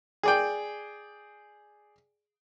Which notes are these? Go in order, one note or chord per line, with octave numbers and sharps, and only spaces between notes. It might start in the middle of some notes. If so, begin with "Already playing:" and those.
G#4 D5 G5